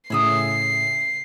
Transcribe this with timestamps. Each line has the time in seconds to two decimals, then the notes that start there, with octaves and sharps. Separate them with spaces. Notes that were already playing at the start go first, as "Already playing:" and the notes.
0.10 A2 C#3 G#4 E5 D#6 C7